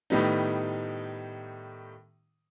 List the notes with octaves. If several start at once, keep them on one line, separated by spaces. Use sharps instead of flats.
A2 D#3 G3 B3 D#4